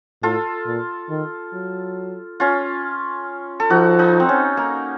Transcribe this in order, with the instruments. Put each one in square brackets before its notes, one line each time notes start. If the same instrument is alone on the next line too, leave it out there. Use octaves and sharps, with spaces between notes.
[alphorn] A2 [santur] F4 A4
[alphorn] A#2
D#3
F#3
[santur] C#4 F4
A4
[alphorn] F3 [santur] D#4 F#4
[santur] D#4
C4
C#4
A#3